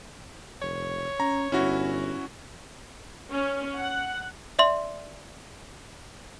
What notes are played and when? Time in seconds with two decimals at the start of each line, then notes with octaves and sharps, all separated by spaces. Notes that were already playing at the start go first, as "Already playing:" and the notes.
0.62 F1 C#5
1.20 C#4 A#5
1.52 G1 C#4 E4 F#4
3.31 C#4
3.76 F#5
4.59 D5 E5 C6